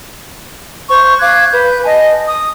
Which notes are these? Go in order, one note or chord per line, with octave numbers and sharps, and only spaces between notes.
C5 C#6
F5 D6 F#6 G#6
B4 G6
D#5 G#5 A5
D#6